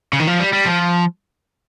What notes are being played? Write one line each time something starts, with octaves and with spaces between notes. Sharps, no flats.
C#3
D#3
F3
G3
G3
F3